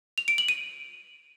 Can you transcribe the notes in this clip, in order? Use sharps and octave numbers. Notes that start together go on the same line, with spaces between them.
F7
D7
F#7
D#7